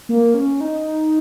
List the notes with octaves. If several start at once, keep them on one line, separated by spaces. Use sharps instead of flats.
A#3
C#4
D#4